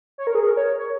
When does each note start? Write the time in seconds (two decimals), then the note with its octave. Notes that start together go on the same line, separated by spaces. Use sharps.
0.18 C#5
0.27 A#4
0.35 G#4
0.46 A#4
0.57 C#5
0.78 C#5